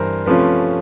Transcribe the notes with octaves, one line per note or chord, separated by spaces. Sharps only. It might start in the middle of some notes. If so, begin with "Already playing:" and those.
Already playing: G2 E3 G3 A#4 C5
C3 F3 A3 C#4 F4 B4